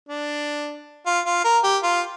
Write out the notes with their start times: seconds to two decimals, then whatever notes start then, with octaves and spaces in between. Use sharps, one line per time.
0.09 D4
1.06 F4
1.26 F4
1.44 A#4
1.64 G4
1.83 F4